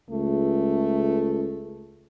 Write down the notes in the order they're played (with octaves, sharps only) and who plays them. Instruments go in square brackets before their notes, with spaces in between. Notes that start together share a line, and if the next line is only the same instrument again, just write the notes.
[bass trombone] C#2 [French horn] A3